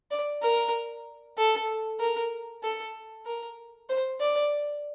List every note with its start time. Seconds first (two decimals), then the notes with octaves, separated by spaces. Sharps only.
0.11 D5
0.42 A#4
1.38 A4
2.00 A#4
2.63 A4
3.25 A#4
3.89 C5
4.20 D5